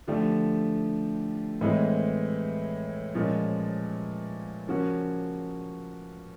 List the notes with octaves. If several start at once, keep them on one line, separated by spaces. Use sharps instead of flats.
D3 F3 A3 D4 G4
A2 E3 G#3 C4
A#2 F3 G#3 C#4
C#3 F3 A#3 C#4 F#4